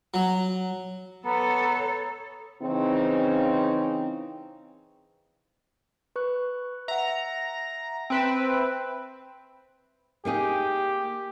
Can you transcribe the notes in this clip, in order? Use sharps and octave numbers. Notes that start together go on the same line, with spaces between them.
F#3
B3 A4 C#5 A#5
C#3 E3 C4 C#4 D#4
B4 C#6 F#6
E5 F#5 A#5
C4 B4 E5 G5 F#6 D7
A#3 D#4 G4 G#4